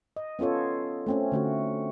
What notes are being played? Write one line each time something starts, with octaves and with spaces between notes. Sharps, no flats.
D#5
B3 C#4 F4 A4 C#5
A3 C4 C#4
D3 A3 F#4